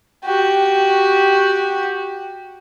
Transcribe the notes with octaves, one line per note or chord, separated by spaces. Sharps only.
F#4 G4